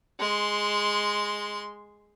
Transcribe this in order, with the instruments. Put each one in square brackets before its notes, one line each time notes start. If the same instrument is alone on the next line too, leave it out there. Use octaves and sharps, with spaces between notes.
[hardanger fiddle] G#3 C6